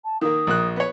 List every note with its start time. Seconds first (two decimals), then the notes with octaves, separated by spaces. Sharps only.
0.05 A5
0.21 D#3 A#3 D#6
0.47 A#1 A#3 F#6
0.76 B3 C#5